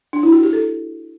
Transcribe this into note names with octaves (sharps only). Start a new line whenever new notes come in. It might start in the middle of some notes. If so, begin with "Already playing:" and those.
D4
E4
F#4
G4
A4